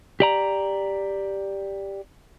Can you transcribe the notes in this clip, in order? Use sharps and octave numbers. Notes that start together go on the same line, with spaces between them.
G4 D5 A#5